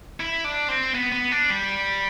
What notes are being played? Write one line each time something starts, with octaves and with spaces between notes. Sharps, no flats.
E4
D4
C4
B3
B3
D4
G3